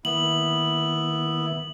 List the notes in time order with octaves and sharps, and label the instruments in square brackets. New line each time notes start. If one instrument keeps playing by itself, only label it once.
[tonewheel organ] D#3 A#3 [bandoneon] B3 E4 [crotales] F#7